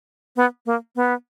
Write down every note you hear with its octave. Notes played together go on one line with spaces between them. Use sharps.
B3
A#3
B3